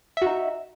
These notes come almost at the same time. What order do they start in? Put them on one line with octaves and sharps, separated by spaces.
E5 F#4 D#4